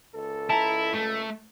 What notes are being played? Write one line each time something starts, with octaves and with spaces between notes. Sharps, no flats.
C#2 A4
E4 A5 A#5
A3